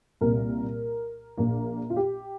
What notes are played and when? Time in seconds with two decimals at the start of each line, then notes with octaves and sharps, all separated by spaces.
0.21 C2 A#2 G3 A#3 A#4
1.38 A#1 A#2 A#3
1.90 F4
1.96 G4